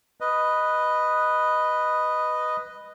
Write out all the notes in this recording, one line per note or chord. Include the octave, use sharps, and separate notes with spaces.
B4 D#5